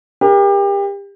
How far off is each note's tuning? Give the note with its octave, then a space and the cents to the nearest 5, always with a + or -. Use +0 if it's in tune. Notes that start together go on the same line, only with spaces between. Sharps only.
G4 +30 A#4 +30